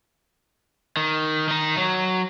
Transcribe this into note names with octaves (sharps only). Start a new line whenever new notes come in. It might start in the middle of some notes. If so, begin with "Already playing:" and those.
D#3
D#3 D#4
F#3